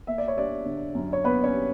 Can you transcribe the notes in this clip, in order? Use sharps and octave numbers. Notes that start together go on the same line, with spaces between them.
A#3 E5
D5
C#5
G3 D4 D5
D3
F#2
C#5
A#3 B3 B4
C#4 C#5
G3